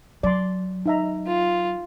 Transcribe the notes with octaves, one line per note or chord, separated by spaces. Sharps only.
F#3 D5 C6
D#4 E5 A#5
F4